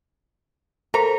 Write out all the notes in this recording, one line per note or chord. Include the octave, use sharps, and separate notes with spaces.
A4 A#4 C5 A#5